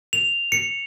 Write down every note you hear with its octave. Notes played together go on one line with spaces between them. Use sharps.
F7
C#7